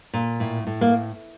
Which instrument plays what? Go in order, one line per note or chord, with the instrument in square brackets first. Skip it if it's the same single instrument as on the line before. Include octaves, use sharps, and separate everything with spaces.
[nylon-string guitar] A#2
A2
A2
A#3